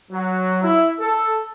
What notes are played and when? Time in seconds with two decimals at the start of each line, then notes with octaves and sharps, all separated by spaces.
0.11 F#3
0.63 E4
1.00 A4